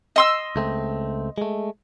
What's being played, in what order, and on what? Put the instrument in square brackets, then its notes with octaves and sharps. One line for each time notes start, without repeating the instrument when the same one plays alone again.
[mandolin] D#5 C6 E6
[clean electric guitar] C#2 A3 C4
G#3 A3